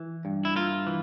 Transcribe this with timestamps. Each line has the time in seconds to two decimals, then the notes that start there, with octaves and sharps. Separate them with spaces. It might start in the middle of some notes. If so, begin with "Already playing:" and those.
Already playing: E3
0.25 G2
0.45 E4
0.56 A#3 F4
0.87 E3